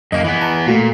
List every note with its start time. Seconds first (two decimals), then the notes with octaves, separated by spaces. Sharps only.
0.12 F#2 A#3 D#5
0.24 E3 B3
0.41 A5 A#5
0.66 A#2 A3 F#4 B6